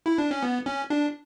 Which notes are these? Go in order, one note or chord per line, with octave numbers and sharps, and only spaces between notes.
E4
D4
C#4
B3
C#4
D4